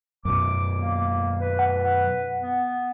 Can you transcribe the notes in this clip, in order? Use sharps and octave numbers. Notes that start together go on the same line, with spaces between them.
F#2 B2 D6
A#3
B4
F#5
B3